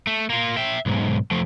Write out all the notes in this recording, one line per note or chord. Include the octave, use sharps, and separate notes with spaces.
A3
A#3 F4
E5 G5
B1 G#2
F3 A3